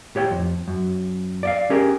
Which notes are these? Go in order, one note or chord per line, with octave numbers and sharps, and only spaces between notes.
A2 G4 C#5 F#5 G5
F2
F#2
D5 E5 F5
C#4 G4 G#4 A#4